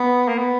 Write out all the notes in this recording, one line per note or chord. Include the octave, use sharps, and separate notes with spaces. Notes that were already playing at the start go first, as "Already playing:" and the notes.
Already playing: B3
A#3
B3